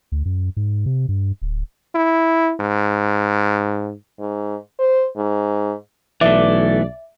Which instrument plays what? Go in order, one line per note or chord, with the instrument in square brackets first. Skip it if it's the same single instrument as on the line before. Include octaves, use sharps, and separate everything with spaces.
[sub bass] D2
F#2
G#2
C3
G2
D1
[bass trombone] E4
G#2
[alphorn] G#2
C5
G#2
[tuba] B1 [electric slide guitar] E3 A3 [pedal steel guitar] D5 [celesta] E5